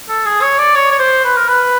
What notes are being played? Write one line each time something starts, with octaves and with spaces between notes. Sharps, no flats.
A4
G#4
C#5
D5
C#5
C#5
C5
B4
A#4
B4